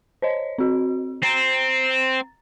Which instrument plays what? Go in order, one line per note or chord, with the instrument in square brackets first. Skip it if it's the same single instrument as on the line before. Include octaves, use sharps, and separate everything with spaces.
[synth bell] C5 C#5 D#5
C4 F#4
[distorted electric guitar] C4 [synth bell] A#5 A6